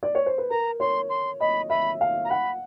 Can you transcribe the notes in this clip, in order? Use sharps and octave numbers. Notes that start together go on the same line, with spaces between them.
D5
C#5
C5
B4
A#4 A#5
C#5 C6
C6
D#5 B5
E5 B5
F5
A#5
F#5 B5